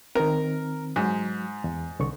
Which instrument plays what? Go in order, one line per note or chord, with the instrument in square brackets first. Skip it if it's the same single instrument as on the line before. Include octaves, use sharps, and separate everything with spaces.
[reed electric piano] D#3 C4 [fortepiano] A#4
[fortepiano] G#2 [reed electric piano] F#3
[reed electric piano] E2
C2 D3 C#6